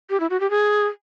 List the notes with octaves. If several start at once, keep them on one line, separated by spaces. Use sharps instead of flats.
G4
E4
F#4
G4
G#4